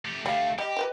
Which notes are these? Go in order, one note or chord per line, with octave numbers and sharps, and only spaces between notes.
A3 G4
D2 G3 A3 C#5 F5
G3 G4 D#5
B4 C5 G5